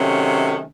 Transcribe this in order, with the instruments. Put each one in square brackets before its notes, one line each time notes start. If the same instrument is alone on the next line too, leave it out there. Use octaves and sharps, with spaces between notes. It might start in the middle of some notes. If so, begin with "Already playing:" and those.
Already playing: [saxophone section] C3 D#3 F#3 A3 C#4